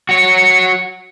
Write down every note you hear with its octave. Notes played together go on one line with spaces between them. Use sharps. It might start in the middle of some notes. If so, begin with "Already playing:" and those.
F#4 C#5